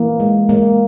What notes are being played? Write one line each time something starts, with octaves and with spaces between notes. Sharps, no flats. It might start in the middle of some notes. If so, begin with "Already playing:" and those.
Already playing: E3 A#3
G#3
G#3 A#3